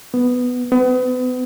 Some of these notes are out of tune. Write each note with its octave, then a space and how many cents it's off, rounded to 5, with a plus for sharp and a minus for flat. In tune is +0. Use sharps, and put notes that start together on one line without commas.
B3 +5
B3 +35